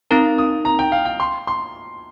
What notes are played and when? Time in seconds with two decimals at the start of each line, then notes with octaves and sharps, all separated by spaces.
0.11 C4 D#4 A#4 A#5
0.38 D#6
0.65 A#5
0.79 G5
0.92 F5
1.05 G5
1.20 C6
1.47 C6